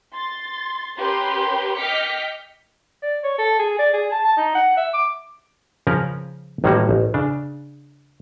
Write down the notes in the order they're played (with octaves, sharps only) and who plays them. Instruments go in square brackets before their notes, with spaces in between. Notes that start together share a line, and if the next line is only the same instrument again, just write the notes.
[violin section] C6 A6
C#4 G4 A#4 B4 B5 C6
D#5 G5 D6 F6 B6 C#7
[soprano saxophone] D5
C#5
A4
G#4
D5
G#4
A5
A5
D#4
F#5
E5
D6
[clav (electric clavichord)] C#3 F3 C#4 A#4 B4
A1 A2 D#3 G3 A#3 F#4
A1
C#3 D4